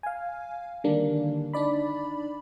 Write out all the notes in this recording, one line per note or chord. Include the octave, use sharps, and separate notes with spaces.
F5 G#5
D3 D#3 G3 A#3 D4
D4 D#4 D5 B5